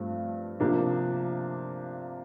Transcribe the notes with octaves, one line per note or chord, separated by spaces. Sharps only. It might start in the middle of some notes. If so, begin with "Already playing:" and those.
Already playing: G2 F3 A3 C4
C3 F3 A#3 D4